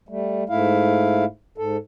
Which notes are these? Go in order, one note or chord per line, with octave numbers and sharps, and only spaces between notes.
G3 A3
G#2 A3 E4 F5
G#2 A4